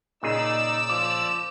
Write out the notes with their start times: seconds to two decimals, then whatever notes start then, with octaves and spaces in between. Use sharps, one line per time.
0.23 A#2 C#3 D#4 G#4 D5 E6
0.90 F3 D6